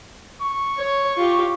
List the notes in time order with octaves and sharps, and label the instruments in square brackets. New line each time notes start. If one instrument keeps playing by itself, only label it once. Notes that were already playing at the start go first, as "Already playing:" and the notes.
[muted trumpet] C#6
[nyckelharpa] C#5
F4 G4